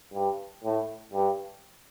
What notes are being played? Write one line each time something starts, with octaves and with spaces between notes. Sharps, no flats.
G2
A2
G2